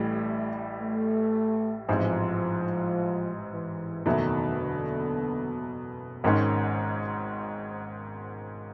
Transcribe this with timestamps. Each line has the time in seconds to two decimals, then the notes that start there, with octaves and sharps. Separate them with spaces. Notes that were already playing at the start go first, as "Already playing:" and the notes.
Already playing: A1 A2 E3 G3 A3
0.80 A3
1.88 A1 G#2 E3 F3 G#3 C4
3.52 E3
4.06 F#1 E2 B2 D#3 F#3 A3
4.60 D3
6.24 G#1 G#2 D#3 G#3 C#4